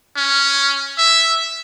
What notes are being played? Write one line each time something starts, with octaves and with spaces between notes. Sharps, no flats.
C#4
E5